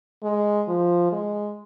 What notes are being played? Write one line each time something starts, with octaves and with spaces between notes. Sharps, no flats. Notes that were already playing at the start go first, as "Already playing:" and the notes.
G#3
F3
G#3